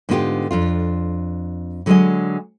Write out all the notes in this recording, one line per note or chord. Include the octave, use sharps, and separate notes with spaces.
G#2 D3 B3 E4 F4 G4
F2 D4 F4
D3 F#3 G#3 F#4 G#4 D#5